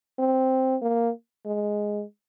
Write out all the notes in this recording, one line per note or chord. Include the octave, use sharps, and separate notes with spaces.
C4
A#3
G#3